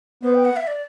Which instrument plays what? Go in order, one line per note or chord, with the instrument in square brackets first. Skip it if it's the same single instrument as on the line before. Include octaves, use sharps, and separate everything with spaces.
[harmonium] B3 [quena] C5
[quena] G5
F#5
E5
D5